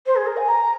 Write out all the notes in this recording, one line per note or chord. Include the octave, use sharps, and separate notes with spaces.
C5
G#4
A#4
G#5
A#5